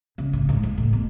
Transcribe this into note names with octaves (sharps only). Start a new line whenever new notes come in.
C#3
A2
G#2
G#2
A2
B2